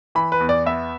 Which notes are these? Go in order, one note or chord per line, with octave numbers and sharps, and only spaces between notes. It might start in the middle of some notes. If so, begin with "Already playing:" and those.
E3 B5
B4
E2
D5
B3 E5